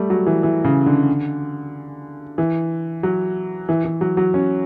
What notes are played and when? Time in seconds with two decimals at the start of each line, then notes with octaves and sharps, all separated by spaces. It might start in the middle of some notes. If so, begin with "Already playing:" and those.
Already playing: G3 A3
0.10 F#3
0.26 E3
0.43 E3
0.64 C#3
0.86 D3
2.38 E3
3.03 F#3
3.69 E3
3.84 E3
4.01 F#3
4.17 F#3
4.34 C#4